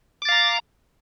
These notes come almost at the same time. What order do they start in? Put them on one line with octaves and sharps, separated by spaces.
D6 A6 F5 A#5